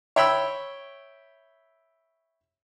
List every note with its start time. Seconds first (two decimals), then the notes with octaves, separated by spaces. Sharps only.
0.16 C#5 E5 G5 B5 E6